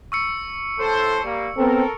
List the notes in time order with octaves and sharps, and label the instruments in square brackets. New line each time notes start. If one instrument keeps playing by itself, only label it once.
[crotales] C#6 E6 C#7
[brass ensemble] A2 A4 C5
G3 A#3
[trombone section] B3 C4 [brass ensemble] A4 A#4